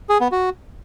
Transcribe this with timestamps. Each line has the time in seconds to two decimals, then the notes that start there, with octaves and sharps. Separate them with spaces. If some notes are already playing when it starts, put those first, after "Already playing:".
0.09 G#4
0.21 B3
0.32 F#4